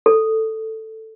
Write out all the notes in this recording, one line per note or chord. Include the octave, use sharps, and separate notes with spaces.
A4